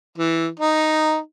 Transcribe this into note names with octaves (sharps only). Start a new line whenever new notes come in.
E3
D#4